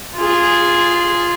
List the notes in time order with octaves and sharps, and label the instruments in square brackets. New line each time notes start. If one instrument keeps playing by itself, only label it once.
[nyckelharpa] F4 G#4